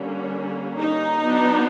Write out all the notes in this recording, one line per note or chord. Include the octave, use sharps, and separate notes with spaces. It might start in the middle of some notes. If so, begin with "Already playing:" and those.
Already playing: D3 G3 A#3 C#4
D#4
F#3 B3 D4